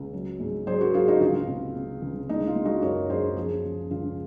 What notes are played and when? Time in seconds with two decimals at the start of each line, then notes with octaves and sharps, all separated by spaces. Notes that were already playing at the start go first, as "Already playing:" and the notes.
Already playing: C#2
0.13 F#3
0.40 G#2
0.67 F#3 G#4 C5
0.81 F#4 A#4
0.94 F#3 F4 G#4
1.08 D#4 F#4
1.21 C#2 F4
1.47 C3
1.75 C3
2.02 C#2
2.29 G#3 D#4
2.47 F4
2.55 G#3
2.65 D#4 F#4
2.82 F#2 A#4 C#5
3.10 F#2 G#4 C5
3.37 F3 F4 G#4
3.64 C#3
3.91 C#2 F4